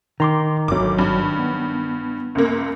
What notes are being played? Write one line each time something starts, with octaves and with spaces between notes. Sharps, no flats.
D#3 A#5 C6 D6
G#1 D2 F#3 D6
G2
B3
C#2 F#2 A#3